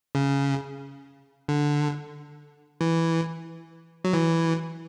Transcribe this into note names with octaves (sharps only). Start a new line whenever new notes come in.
C#3
D3
E3
F#3
E3